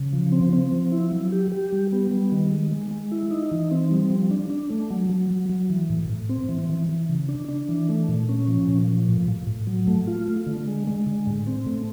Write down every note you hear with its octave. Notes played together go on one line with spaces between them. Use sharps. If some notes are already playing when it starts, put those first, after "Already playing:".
Already playing: C#3
F3
C4
C4
F3
E4
F#3
G4
G4
G3
B3
G3
D#3
G#3
G#3
G#3
E4
D#4
E3
C4
G3
F3
D4
D4
A3
F#3
F#3
F#3
F#3
E3
A2
A2
C4
E3
E3
E3
C#3
D4
D4
E3
A3
A#2
C#4
F3
A#2
F3
A2
A2
A2
F#3
A3
F4
A3
D3
G#3
G#3
D3
A2
C4
A3